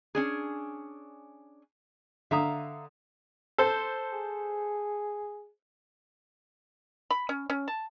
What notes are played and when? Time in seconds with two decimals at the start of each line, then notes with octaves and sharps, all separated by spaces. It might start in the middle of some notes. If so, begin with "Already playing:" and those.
0.15 C#4 D4 G#4
2.31 D3 E5 F5 A#5 D#6
3.58 A4 C5
4.12 G#4
7.11 B5
7.29 C#4
7.50 C#4
7.68 A5